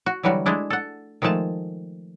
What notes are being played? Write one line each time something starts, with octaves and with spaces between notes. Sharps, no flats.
F#4
D3 E3 F#3 G3 F#4
G#3 A3 D4 E4
A4 F#5
D#3 F3 G#3 A3 A5